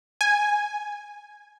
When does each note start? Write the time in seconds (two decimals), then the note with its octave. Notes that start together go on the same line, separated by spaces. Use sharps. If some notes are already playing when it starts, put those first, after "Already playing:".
0.21 G#5